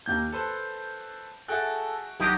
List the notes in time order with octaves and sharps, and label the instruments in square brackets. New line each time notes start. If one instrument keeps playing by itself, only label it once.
[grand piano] D#2 A#3 G#6 [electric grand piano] G6
[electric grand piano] A4 B4 C5 [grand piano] A5
[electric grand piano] F#4 G5 F#6 [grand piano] G#4 E5 [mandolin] A4
[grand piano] B1 [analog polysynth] F#3 D#4 G4 [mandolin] A#3 D#6 G6